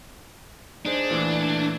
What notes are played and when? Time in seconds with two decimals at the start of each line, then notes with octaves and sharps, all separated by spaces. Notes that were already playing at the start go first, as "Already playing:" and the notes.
0.85 D4 D#4 G#4 C5
1.10 A#2 E3 A3